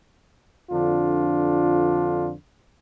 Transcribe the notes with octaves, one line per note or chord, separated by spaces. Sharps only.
F2 D3 D4 F4